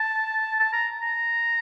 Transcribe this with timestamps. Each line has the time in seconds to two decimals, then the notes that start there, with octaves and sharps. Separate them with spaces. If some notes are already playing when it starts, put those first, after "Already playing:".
Already playing: A5
0.60 A5
0.73 A#5
1.01 A#5